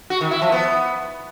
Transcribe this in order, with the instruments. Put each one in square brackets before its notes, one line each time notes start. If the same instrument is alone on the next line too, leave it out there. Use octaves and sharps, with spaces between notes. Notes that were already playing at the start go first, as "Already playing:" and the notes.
[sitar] F#4
D#3
E4
F3
B3